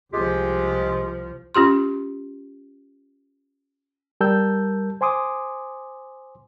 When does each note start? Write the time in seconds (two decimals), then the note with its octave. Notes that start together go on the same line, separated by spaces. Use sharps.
0.12 C2 F3 G#3 F4 G4
1.55 C#4 F4 G4 C6
4.21 G3 A#4 A5 E6 G6
5.01 C5 G#5 C6 D6 D#6